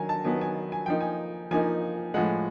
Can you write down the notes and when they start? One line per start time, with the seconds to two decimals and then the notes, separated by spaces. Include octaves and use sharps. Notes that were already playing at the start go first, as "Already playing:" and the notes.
Already playing: D#3 F#3 G#5 A#5
0.09 A5
0.25 D#3 F#3 B3 G#5
0.41 G#5
0.72 G#5
0.86 F3 A#3 D#4 G5
1.01 G#5
1.51 F3 A#3 D#4 G#5
2.14 A2 F3 G#3 F#5